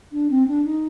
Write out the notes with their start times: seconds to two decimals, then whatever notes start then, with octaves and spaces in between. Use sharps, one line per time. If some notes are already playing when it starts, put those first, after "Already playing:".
0.12 D4
0.30 C4
0.48 D4
0.65 D#4